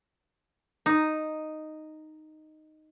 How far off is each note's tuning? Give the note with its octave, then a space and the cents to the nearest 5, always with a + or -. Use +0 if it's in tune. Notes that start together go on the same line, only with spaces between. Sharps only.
D#4 -5